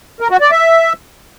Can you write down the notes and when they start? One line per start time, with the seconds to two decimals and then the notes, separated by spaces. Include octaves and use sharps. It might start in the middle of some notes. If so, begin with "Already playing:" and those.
0.20 A#4
0.31 F#4
0.41 D5
0.51 E5